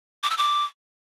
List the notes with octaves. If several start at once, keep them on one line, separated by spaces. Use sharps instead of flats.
D6
E6
D6